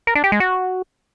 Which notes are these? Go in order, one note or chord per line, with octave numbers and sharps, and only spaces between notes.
A#4
D4
G4
G#3
F#4